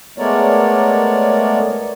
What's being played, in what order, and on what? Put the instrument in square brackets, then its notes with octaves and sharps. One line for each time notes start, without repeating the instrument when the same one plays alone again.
[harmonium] G#3 A3 B3 A#4 C#5 D5